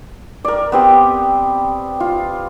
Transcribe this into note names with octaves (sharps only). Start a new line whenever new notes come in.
A#4 D5
B3 C4 G4
F4